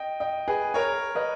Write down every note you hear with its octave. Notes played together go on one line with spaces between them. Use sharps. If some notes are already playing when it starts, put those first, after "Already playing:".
Already playing: D#5 G5
D#5 G5
G#4 B4
A#4 C#5
B4 D#5